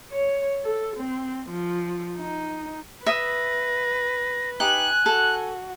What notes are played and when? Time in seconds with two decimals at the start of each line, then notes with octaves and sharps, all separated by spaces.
0.12 C#5
0.64 A4
0.96 C4
1.49 F3
2.17 D#4
3.06 B4 E5 D#6 A#6
4.60 D#4 G4 G#5 F#6
5.06 F#4 A4